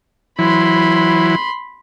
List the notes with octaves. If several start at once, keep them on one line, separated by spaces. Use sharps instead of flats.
E3 F#3 E4 B5 C6